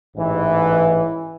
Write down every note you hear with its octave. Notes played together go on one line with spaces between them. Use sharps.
A1 G#2 E3